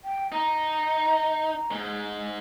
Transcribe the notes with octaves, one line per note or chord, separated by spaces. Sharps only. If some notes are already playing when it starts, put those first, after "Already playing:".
G5
D#4 A#5
G#2 G#3